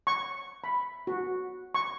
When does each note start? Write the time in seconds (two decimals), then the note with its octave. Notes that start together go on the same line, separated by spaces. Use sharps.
0.07 C#6
0.64 B5
1.07 F#4
1.75 C#6